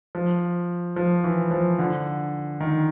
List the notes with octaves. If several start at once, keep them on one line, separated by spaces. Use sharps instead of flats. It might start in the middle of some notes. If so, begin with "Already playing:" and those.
F3
F3
E3
F3
D3
D#3